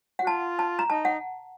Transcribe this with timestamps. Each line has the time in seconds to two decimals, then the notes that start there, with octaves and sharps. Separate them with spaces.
0.19 F#4 F#5
0.27 F4 A5
0.59 A5
0.79 A#5
0.89 D#4 A5
1.05 F#5